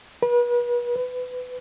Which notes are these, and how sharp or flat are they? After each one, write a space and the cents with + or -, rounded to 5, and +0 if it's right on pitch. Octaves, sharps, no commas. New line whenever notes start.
B4 -35
B4 +25